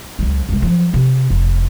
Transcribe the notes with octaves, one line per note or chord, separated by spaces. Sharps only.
C#2 F#3
C2 G#3
F3 F#3
C3
F1